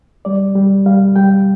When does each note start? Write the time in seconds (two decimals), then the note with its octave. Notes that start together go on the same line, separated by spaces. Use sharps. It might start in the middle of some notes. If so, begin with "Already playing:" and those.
0.25 G3 D5
0.55 G3
0.86 G3 F5
1.16 G3 G5